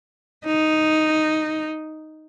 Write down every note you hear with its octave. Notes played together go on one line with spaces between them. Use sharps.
D#4